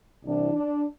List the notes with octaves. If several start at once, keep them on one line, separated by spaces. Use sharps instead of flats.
C2 C3 E3 D4
D4